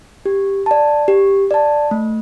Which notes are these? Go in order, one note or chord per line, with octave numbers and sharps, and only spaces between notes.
G4
D5 A5
G4
D5 A5
A3